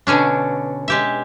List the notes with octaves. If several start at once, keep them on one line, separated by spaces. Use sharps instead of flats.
B2 D3 C#4 D4
G#3 G4 E5